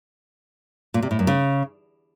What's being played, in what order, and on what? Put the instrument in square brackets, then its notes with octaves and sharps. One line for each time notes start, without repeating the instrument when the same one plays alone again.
[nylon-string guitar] A#2
C3
A2
F#2
C#3